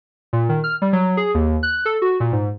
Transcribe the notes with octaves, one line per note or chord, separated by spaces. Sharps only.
A#2
D#3
F6
G3
F#3
G#4
D#2
F#6
A4
F#4
A#2
G#2